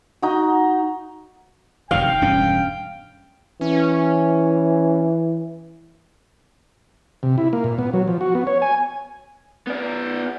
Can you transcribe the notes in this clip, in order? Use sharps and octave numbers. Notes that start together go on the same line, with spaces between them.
D#4 F#4
F1 F#2 D#3 F5 G5
E1 G2 C#4
E3 C#4
C3
E4
A#3
A#2
B3
F#3
F3
F#4
B3
C#5
G#5
B3 D5